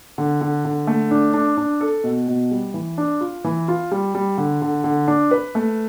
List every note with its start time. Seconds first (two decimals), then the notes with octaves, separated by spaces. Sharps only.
0.18 D3
0.41 D3
0.65 D3
0.87 A3
1.11 D4
1.34 D4
1.57 D4
1.81 A4
2.04 B2
2.28 B2
2.51 G3
2.74 E3
2.98 D4
3.21 F4
3.44 E3
3.68 F4
3.92 G3
4.15 G3
4.38 D3
4.62 D3
4.84 D3
5.08 D4
5.31 B4
5.55 A3